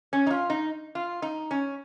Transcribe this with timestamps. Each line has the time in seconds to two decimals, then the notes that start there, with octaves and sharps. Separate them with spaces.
0.13 C#4
0.27 D#4
0.31 F4
0.50 D#4
0.95 F4
1.22 D#4
1.51 C#4